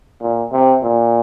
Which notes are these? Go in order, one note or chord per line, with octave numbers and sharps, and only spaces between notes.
A#2
C3
A#2